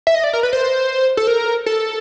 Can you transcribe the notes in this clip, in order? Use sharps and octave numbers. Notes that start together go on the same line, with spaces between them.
E5
D#5
D5
A#4
B4
C5
A4
A#4
A4